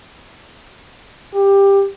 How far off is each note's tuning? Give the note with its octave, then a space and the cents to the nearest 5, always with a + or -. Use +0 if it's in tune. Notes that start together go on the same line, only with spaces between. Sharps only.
G4 +15